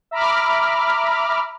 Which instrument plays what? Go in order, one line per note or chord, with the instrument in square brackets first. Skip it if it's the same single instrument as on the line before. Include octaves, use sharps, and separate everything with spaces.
[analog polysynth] E5 A#5 B5 D6 F6